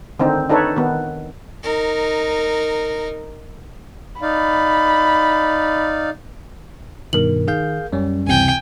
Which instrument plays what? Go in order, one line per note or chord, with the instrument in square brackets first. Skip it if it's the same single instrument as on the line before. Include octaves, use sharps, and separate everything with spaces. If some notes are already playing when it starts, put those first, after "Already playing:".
[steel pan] D3 D#3 C4 D#4
D4 D#4 A4 B4 C#5
D#3 B3
[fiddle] D#4 A#4
[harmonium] D#4 D5 F5 [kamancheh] B5
[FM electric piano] G2 B2 D#3 [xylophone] A#4 F#7
[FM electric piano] D#3 [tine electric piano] G#4 F5 G6
[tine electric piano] F#2 G3 [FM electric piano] C#4
[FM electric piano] C#2 C3 E3 [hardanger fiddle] G5 G#5